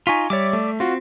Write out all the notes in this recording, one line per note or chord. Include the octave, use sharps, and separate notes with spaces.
D#4 F4 G#5 C#6 B6
G3 C#5 D5 E5 D6
A3
C4 F4 F#4